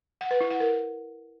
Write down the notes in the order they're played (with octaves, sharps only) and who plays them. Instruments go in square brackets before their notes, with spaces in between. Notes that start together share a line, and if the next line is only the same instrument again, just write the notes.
[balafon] F#5
B4
E4
F#5
A#4